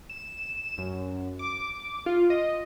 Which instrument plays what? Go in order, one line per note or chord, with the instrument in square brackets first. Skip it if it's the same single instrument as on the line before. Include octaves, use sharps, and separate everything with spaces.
[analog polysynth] E7
F#2
D6
F4
D#5